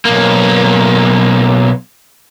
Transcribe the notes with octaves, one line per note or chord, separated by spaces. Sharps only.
B1 A#3